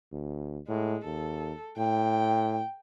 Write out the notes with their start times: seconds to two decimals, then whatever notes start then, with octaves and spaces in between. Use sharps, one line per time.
0.12 D2
0.68 A2 G#3
1.05 D#2 A4
1.78 A2 G5